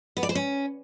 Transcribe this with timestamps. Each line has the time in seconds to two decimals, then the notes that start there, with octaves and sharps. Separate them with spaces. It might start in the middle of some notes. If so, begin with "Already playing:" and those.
0.17 B3
0.23 D5
0.29 C5
0.35 C#4